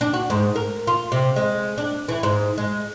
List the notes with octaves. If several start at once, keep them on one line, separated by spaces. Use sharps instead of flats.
D4
F#4
G#2
A#4
F4
C3
G#3
D4
E3
G#2
G#3